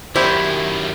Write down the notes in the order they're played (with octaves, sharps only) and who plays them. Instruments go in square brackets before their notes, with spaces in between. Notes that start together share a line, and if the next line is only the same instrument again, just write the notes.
[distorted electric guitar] F#2 D#3 [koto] E4 [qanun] G4 [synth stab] C5 D5 G5